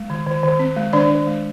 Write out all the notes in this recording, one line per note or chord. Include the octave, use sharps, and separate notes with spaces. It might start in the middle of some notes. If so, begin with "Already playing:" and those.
Already playing: G#3
D#3
D#3
D#3
C4
G#3
D#3 D4 D5
D#3
G#3